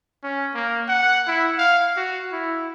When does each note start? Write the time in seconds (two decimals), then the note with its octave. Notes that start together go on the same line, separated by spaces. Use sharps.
0.24 C#4
0.54 A#3
0.88 F#5
1.27 E4
1.58 F5
1.97 F#4
2.33 E4